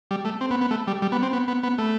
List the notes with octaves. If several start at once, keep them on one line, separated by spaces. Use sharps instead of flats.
G3
A3
C4
B3
B3
A3
G3
G3
B3
C4
B3
B3
B3
A3